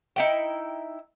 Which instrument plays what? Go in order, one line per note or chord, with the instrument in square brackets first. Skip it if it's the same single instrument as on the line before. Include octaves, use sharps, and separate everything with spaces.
[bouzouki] D#4 E4 G5